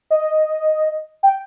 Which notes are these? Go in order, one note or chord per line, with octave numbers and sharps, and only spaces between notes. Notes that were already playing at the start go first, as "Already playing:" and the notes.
D#5
G5